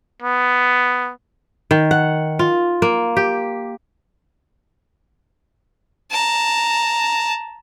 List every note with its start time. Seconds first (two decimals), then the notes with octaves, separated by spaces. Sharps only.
0.22 B3
1.71 D#3
1.91 F#5
2.39 F4
2.82 A#3
3.17 G4
6.11 A5 A#5